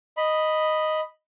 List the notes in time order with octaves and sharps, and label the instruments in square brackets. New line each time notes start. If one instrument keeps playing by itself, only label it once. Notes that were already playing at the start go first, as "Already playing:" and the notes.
[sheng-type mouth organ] D#5 B5